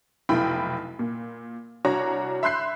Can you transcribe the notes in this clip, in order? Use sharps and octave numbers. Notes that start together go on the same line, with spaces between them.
F1 B1 E4 G5 B5
A#2
C2 D4 F#4 C#5 A#5
E5 B5 C6 F#6 G6 C7